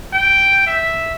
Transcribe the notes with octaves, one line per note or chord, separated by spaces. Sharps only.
G5
E5